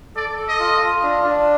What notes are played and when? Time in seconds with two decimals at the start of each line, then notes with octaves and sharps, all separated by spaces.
0.16 A4 D5
0.38 A4
0.48 D#5
0.59 F4
0.81 F4
1.02 D4
1.23 D4